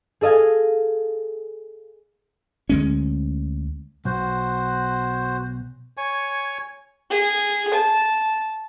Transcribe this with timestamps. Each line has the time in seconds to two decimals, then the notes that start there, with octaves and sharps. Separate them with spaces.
0.21 G#4 A4 D#5 F5 G#5
2.69 D2 G#3 C#4
4.05 B1 F#4 C5
5.97 C#5 G#5 C#6
7.10 G#4
7.74 A5